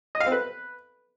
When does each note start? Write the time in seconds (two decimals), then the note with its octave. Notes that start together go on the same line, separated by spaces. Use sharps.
0.15 D#5
0.20 F5
0.26 C4
0.32 B4